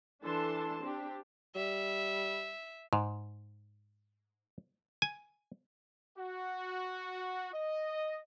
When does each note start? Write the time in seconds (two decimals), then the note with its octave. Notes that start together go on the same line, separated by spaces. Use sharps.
0.23 E3 D4 A4 A5 C6
0.83 C4 D4 G4
1.56 G3 E5
2.93 G#2
5.02 G#5
6.18 F#4
7.54 D#5